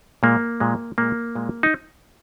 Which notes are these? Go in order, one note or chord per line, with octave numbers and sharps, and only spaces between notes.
A#2 G#3 A#3
A#2 G#3
A#2 G#3 A#3
A#2 G#3
D#4